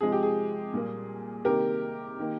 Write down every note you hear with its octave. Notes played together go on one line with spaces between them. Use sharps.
C3 F3 G#3 G#4
G4
G#4
A#2 G3 A#3
C3 D#3 A#3 G4 A#4
D#3 A#3